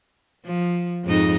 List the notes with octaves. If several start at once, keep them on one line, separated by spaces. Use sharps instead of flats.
F3
F2 G#2 D#4